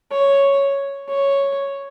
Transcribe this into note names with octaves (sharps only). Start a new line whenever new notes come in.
C#5
C#5